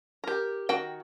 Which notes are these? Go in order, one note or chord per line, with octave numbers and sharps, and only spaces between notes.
G4 A#4
D#3 F#4 G5